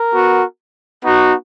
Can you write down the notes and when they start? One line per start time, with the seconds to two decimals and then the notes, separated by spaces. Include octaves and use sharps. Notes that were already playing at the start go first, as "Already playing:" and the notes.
Already playing: A#4
0.11 B3 F#4
1.02 B3 D#4 F#4